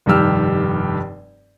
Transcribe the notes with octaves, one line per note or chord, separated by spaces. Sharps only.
F1 G2 D#3 G4 E6 F6